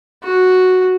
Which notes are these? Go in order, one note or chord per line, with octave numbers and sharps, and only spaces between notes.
F#4